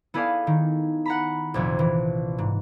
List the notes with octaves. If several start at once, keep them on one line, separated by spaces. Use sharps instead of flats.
B3 E4 G#4 A4 D5 F5
D#3
F#5 A#5 B5
A#1 F2 C3 F3
E3
G#2